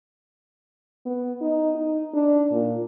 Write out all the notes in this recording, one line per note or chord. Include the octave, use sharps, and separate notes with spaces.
B3
D#4
D#4
D4
A#2